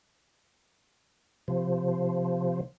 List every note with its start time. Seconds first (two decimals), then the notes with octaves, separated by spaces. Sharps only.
1.48 C3 F3